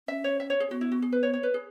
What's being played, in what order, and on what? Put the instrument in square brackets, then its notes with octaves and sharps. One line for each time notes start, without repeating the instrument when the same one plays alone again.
[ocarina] C#4 [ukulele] E5
[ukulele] C#5
E5
C#5
G#4
[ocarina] B3 [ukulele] F#4
[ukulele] E4
F#4
G#4
B4
C#5
C#5
B4
G#4